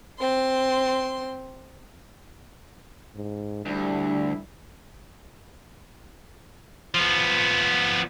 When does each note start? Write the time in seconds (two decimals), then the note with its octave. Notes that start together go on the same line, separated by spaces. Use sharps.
0.19 C4 C6
3.15 G#2
3.66 D2 G3 D4 E4
6.95 F3 B3